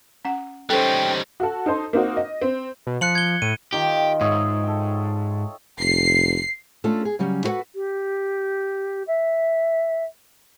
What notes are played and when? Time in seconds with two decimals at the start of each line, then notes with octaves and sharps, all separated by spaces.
0.25 C#4 F#5
0.70 G3 C#4 D#4 A4 C5 G5
1.40 F#4 A4
1.66 D#4 A4 C5
1.93 A#3 C4 D#4 F#4
2.17 D#5
2.41 C4
2.87 B2
3.01 F3 F#6 C#7 F#7
3.15 G#6 G7
3.42 A2 D#7
3.73 D#3 F4 G4
4.21 G#2 C#5 D#5 E5
4.64 A4 G5
5.79 F1 C7
6.84 A3 C#4 D4 F4 A4
7.05 G#4
7.19 C#3 F#3 G3 C#4
7.44 E4 F#4 A4 B4 F#5
7.75 G4
9.07 E5